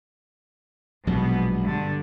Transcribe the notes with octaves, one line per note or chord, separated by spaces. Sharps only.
A#1 B2 F#3 G#3 B3
G2 D3